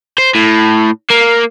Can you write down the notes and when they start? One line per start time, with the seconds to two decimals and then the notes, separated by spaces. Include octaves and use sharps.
0.18 C5
0.35 A2
1.11 A#3